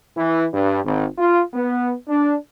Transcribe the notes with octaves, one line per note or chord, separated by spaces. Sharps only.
E3
G2
G#1
F4
B3
D4